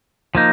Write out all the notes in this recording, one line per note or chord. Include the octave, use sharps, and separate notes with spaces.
F3 A#3 D#4